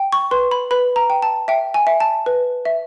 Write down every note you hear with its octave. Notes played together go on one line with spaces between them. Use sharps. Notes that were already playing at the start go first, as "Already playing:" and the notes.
Already playing: G5
C#6
B4 C6
B5
B4 B5
A#5
G5
A5
E5 G5
G#5
E5
A5
B4
E5